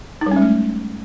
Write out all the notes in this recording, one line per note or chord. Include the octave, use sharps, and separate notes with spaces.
D#4
G3
C#4
G#3
A3